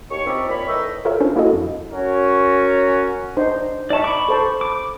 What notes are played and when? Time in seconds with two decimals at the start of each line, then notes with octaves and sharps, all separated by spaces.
0.11 D#2 C#5 C#6
0.26 F3 C4 C#4 D#4 E4 D5
0.50 A#2 C#5 B5
0.67 A2 E3 D#4 D#5 E6
1.05 F4 A4 A#4 C5 C#5 E5
1.20 C#4 D4 F4 C5
1.36 A#3 E4 F#4 A4 D#5
1.53 F2
1.91 C#4 F#4 A#4 C#5
3.37 D4 D#4 C5
3.90 D#4 D5 E5 A5 C#6
4.04 B5 C#6 D6
4.29 A4 C5 A5
4.61 D6